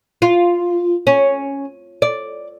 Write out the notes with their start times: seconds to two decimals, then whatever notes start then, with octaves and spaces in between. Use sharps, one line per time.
0.22 F4
1.07 C#4
2.02 D5